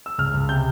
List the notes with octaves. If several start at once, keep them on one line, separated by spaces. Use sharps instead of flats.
E6
C#2 F6
C#2
C3 G6